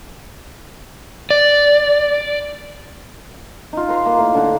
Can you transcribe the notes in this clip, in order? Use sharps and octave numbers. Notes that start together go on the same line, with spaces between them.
D5
D#4 F4
B4 A#5 C6
A#3
A2 A#3
D3 F#5